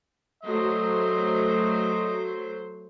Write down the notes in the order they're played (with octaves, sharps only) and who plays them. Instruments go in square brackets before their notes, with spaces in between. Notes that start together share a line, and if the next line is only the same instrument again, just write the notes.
[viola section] F#3 A3 C5 [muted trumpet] D#5